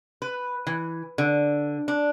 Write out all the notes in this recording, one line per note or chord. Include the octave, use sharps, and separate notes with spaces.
B4
E3
D3
D4